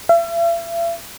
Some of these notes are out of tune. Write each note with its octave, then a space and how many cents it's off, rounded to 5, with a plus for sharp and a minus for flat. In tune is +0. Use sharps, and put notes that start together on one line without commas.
E5 +45